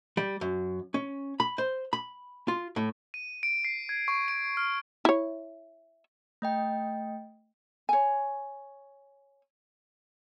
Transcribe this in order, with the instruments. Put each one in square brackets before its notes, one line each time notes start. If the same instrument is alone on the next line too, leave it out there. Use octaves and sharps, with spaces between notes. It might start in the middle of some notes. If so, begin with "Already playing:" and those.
[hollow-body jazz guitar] G3
F#2
C#4
B5
C5
B5
F4
A2
[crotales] D#7
D7
C7
G#6
C#6
D7
F6
[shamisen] E4 C#5
[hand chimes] A3 D#5 G5
[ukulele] C#5 G#5